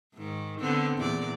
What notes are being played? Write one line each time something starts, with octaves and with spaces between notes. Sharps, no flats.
G#2 D#3
D3 B3 C4
E2 A#2 D5